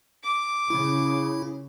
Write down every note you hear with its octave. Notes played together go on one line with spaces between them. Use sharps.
D6
C#3 E4